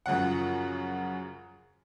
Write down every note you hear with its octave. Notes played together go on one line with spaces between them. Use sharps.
F#2 C#3 F3 F#5